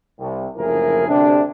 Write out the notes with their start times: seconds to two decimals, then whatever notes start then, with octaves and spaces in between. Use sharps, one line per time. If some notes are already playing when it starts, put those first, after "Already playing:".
0.20 C2
0.57 F#1 D2 F3 E4 G#4 A#4
1.08 D2 C3 D4